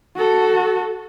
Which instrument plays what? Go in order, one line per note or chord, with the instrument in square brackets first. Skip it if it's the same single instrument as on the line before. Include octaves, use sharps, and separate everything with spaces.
[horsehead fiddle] F#4 A4